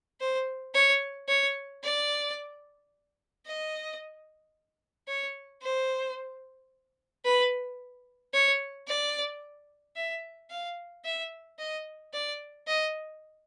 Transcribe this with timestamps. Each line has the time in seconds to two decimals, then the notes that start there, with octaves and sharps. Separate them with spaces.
0.20 C5
0.74 C#5
1.28 C#5
1.83 D5
3.45 D#5
5.08 C#5
5.62 C5
7.25 B4
8.33 C#5
8.88 D5
9.96 E5
10.50 F5
11.04 E5
11.59 D#5
12.13 D5
12.67 D#5